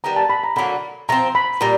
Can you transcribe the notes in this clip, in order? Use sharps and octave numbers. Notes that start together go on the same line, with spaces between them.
D#3 G3 B3 A#5
A5
B5
A#5
D3 F#3 A#3 B5
F3 A3 C4 A#5
B5
A#2 G3 A#5